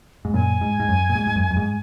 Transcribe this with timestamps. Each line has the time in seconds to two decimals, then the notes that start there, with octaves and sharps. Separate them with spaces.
0.25 G#2
0.34 F#2 A#2 G#5
0.61 G#2
0.80 G#2
0.89 F#2
1.09 A#2
1.15 G#2
1.27 G#2
1.36 F#2
1.50 F#2
1.57 G#2